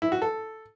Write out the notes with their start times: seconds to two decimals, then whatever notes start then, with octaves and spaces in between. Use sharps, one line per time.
0.02 E4
0.12 F#4
0.22 A4